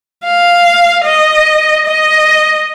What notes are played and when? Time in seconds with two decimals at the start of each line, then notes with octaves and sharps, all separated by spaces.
0.25 F5
1.05 D#5
1.86 D#5